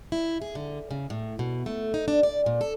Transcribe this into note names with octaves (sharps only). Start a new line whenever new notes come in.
E4
G#4
D3
C#3
A2
B2
A3
D#4
D4
D5
A#2
A4